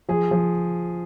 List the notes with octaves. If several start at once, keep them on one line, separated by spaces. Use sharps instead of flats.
F3 G#4
F3